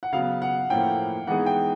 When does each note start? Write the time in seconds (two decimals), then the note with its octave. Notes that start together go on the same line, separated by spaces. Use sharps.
0.03 F#5
0.13 C#3 F#3 B3 F5
0.42 F#5
0.70 A2 F3 A#3 C#4 E4 G5
1.27 E3 G#3 B3 D#4 G#4 F#5
1.46 G5